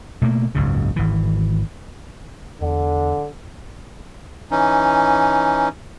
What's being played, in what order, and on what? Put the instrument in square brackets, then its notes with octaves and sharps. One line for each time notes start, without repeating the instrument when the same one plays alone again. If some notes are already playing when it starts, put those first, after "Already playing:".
[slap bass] B2 A3 A#3
F#1 C#2 G#2 C#3
G#1 E3
[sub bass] E2 [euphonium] D3
[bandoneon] E3 C#4 D#4